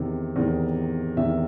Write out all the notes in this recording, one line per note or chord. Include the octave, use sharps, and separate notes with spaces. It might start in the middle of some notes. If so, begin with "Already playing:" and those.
Already playing: E2 C3 D#3
E2 C3 D#3
E2 C3 D#3 E5